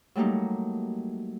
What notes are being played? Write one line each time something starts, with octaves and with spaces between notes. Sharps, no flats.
F#3 G3 A3 A#3 D#4